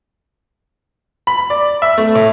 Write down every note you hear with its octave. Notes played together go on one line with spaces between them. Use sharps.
B5
D5
E5
A3
A2